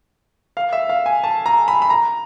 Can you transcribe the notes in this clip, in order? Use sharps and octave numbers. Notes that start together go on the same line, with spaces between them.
F5
E5
F5
G#5
A5
A#5
B5
B5
A#5